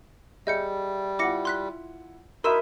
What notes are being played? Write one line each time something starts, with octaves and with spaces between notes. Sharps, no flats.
G3 G#4 D#5 E5 G6 C#7
E4 F4 F#5 D6 A#6 C#7
C6 F#6 B6
D#4 E4 F#4 A#4 E5 C6 E6 E7